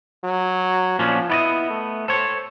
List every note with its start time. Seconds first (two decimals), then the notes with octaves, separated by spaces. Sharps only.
0.24 F#3
0.99 A#2 F3 C#4 D4
1.30 B3 E4 D5 D#5
1.70 A3
2.08 A4 C5 C#5